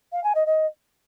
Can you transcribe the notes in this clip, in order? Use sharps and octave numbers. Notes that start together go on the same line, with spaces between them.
F5
G#5
D#5
D#5